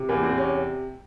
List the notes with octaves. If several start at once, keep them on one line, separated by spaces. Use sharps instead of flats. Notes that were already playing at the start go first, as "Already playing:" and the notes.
Already playing: C3
E2 A#3
C4
C3
C#4